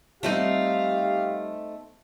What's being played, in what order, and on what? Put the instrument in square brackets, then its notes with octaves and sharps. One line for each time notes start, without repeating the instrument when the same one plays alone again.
[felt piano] F3 G3 [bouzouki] A3 C4 D#4 [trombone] G4 [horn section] F5